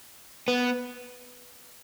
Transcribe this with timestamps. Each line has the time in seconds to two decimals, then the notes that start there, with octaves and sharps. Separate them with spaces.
0.48 B3